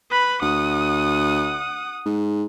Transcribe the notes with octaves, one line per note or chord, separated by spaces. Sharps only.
B4 B5
D2 F#5 D#6
G#2